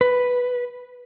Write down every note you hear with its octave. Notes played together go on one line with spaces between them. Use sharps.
B4